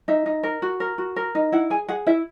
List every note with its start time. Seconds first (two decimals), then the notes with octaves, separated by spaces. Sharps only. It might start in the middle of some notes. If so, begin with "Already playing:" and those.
0.08 D#4 E5
0.26 D#4
0.43 A#4
0.62 F#4
0.80 A#4
0.98 F#4
1.16 A#4
1.35 D#4
1.52 E4 F#5
1.70 G#4 G#5
1.88 G#4 F#5
2.07 E4 E5